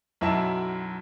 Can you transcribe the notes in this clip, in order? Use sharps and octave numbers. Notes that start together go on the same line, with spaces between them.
B1 F#2 E4 E5 A5 E7